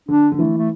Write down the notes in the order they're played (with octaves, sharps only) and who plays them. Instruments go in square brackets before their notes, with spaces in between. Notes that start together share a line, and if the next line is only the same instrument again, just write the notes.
[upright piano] D3 [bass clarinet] D4
[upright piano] D3
[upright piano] E3 [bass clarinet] A3
[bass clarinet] A3